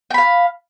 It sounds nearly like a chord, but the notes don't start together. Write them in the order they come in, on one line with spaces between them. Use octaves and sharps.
G5 B5 F5